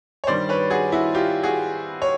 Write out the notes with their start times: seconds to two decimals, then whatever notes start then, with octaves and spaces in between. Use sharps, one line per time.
0.24 C#5
0.27 G2 D#3 G3 C5 D5
0.49 B4 C#5
0.70 F#4 G#4
0.92 E4 F#4
1.14 F4 G4
1.43 F#4 G#4
2.02 C#5